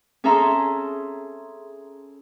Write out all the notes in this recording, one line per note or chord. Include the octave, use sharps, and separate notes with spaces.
C#4 G#4 A4 E5 A#5 C6